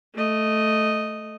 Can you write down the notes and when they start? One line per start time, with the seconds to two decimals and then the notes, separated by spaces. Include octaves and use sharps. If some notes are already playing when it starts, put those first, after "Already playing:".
0.15 A3 D#5